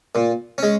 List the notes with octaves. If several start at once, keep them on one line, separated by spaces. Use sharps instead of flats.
A#2
G#3 C#4